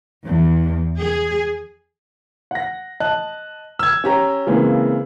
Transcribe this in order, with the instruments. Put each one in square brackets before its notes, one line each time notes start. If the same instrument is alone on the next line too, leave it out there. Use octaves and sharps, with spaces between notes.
[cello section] E2
G#4
[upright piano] F#5 A#6
D#5 A5 F#6
E6 G#6
C#4 G4 A#5
C#3 E3 G#3 A#3 C4